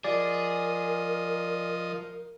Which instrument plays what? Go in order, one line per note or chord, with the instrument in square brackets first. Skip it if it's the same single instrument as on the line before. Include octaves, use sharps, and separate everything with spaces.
[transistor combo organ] F3 D#5 [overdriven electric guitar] G#4 [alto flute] A#4 [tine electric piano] D5